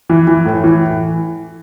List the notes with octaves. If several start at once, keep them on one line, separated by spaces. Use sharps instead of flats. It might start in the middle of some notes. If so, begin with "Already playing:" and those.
E3
E3
A2
E3